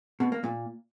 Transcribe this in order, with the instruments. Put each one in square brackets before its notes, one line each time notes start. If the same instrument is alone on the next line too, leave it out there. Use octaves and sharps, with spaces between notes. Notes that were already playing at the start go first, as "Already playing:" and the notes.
[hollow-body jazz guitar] B2
A#3
A#2